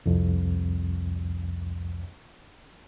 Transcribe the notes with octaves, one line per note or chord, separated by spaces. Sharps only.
C2 F2